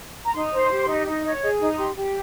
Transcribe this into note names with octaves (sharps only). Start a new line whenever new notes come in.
A#5
D#4 C6
C5
C6
G4
C6
D#4
D#4
C#5 D#5
G#4 D#5
D#4 D#5
G4 C6
G4